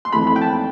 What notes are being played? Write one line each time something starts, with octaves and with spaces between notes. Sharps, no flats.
C6
F2 E3 A3 E4 B5
B5
G5
A5